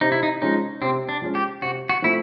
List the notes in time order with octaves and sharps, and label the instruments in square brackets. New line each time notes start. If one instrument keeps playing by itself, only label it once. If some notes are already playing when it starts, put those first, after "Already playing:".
[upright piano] C3 [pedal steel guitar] D#4
[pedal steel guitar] E4
D#4
[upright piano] F3 G#3 C#4 [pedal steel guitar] D#4
[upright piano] C3 [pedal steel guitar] C4
[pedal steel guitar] D4
[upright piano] F3 G#3 C#4
[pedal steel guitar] G4
[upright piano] C3 [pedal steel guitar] F#4
[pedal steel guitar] F#4
[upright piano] F3 A3 C4 [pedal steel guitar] E4